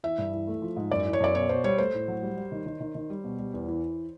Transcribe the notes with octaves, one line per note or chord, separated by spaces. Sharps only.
E3 E5
G2
E3
A3
F3
G#2
F#2 D5
E3
C#5
F#2 D5
B2 C#5
B2 C5
G3 C#5
A3 C5
A2
F#3
G3
G3
D#3
D#3
D#3
D#3
G3
B2
G3
E2
E3